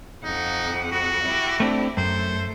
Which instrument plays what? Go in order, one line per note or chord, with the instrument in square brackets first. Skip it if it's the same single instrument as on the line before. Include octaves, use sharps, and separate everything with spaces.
[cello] F2 F#5 [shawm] D#4
[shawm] F#4
[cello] E4 G4
[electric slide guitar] A3 C4 D4
[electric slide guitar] F#2 [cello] A3 [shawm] C5